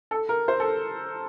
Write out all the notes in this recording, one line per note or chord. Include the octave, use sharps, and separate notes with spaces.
A4
A#4
C5
A4